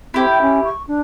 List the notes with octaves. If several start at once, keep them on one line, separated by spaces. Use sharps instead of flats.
C4 E4 G4
G5
C#4
C#6
D4